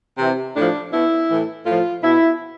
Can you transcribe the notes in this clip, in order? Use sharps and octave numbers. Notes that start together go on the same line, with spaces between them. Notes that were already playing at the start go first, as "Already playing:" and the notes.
C3 E3
A2 F3 D4
B2 E4
A2 E3
A2 F3 F4
B2 E4